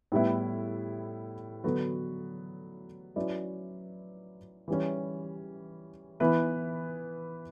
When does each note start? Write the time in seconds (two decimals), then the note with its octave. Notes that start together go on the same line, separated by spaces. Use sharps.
0.12 A2 G3 B3 E4
1.64 D3 F#3 B3 F#4 A4
3.16 F#3 C#4 E4 B4 D5
4.68 E3 G3 C#4
6.20 E3 B3 E4 B4